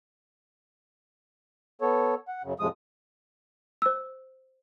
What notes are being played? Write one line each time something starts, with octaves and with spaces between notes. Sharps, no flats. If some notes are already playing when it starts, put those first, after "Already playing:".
B3 A4 C#5
F#5
F#2 C#3
F2 A2 C3 F3 G#3 D#6
C5 E6